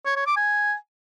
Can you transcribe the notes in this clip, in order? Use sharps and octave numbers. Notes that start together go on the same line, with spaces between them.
C#5
C#5
D6
G#5